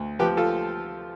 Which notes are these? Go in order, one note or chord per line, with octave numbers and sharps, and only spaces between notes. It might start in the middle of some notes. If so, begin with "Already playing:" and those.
Already playing: D2
F3 G4 B4
F4 A4